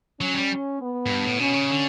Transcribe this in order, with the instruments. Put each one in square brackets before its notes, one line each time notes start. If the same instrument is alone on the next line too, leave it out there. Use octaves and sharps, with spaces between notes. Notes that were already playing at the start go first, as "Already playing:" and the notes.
[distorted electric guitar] F#3 [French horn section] C#4
[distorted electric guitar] G3
[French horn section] B3
[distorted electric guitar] A2
G2
A2
[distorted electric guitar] B2 [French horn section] C#4
[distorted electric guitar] C#3
D3